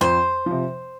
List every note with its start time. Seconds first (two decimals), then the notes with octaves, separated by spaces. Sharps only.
0.01 F2 C5
0.46 C3 F3